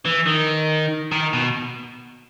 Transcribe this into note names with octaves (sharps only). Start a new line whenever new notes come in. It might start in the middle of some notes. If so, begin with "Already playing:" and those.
E3
D#3
D#3
B2